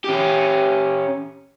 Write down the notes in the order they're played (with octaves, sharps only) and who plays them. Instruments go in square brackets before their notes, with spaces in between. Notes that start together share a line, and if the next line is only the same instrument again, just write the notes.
[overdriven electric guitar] C#4 G4